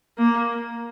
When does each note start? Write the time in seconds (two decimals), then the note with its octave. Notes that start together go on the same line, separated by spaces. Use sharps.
0.18 A#3